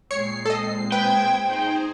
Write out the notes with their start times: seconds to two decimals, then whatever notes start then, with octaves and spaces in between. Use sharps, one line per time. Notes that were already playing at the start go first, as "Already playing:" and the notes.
0.11 A#2 G#3 C4 C#5 C7 C#7
0.45 A4 D#5
0.92 B4 C5 G5 G6 G#6
1.46 D#4 G#4 C5